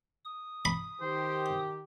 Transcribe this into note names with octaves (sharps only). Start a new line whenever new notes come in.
D#6
B5
D#3 G4 C5